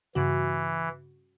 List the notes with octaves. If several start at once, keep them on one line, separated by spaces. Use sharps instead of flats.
G2 C#3 E3 F#4